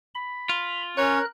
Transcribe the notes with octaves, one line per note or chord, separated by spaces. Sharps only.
B5
F4
C#4 A#4 C#5 F#6